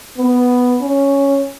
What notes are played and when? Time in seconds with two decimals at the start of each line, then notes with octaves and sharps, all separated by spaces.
0.18 B3
0.81 C#4